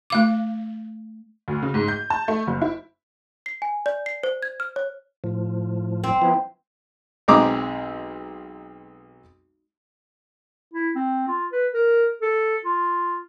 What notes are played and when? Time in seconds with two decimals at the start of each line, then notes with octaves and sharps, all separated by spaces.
0.10 A3 F5 D6
1.48 D2
1.63 C#3
1.74 G#2
1.88 G6
2.10 A5
2.28 A3
2.47 F#1
2.62 E4
3.46 C7
3.62 G#5
3.86 D5
4.06 C7
4.23 C5
4.43 G#6
4.60 F6
4.76 C#5
5.24 A2 F3
6.04 C4
6.22 F3 B3 E4
7.28 B1 G#3 C4 A#5 D6 D#6
10.74 E4
10.95 C4
11.28 F4
11.52 B4
11.74 A#4
12.22 A4
12.65 F4